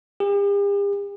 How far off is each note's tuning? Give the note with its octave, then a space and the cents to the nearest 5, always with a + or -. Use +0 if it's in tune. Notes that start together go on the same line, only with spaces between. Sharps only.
G4 +45